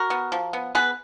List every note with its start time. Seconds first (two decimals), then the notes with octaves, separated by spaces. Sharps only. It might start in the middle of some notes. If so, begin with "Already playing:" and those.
Already playing: F#4 A#4
0.10 B3
0.32 F3
0.53 B3
0.75 B3 G#4 B4